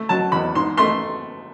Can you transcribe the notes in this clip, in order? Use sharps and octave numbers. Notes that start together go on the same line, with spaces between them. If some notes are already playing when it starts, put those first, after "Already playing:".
Already playing: A3
F#3 A5
E2 B5
G#2 C6
A3 C6